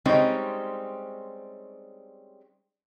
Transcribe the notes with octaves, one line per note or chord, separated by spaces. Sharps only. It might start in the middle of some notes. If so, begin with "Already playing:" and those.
G3 G#3 C4 C#4 D#4